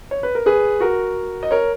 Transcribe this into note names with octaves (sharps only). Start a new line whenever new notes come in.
C#5
B4
A#4
G#4 B4
F#4 A#4
D#5
A#4 C#5